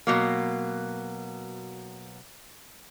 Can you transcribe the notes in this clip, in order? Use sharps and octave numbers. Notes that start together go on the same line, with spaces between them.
B2 F#3 A#3